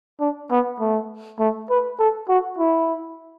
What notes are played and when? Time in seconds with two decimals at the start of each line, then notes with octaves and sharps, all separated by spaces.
0.20 D4
0.51 B3
0.80 A3
1.39 A3
1.69 B4
1.99 A4
2.29 F#4
2.58 E4